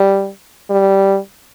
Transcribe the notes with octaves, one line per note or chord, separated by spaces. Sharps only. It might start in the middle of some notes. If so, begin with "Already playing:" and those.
Already playing: G3
G3